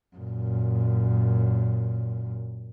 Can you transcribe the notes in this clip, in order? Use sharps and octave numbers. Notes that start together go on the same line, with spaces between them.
F#2 A#2